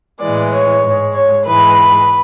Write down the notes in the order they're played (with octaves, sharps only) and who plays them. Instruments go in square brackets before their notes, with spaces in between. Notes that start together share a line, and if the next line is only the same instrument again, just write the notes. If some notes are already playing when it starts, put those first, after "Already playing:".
[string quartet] A2 E3 G#3 D5
C#5
G#2 G#3
C#5
G#2 E3 G#3 B4